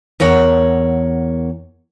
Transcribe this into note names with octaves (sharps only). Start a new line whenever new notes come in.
E2 A#4 C#5 F#5